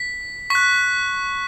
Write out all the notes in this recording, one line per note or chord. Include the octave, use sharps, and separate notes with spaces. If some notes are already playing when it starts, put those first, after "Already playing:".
Already playing: B6
C#6 F#6 B6